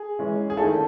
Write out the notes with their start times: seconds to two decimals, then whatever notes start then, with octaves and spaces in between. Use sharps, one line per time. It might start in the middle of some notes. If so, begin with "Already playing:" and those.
Already playing: G#4
0.19 E3 G#3 C#4
0.50 G#4
0.57 D#3 A3 C#4 E4 A4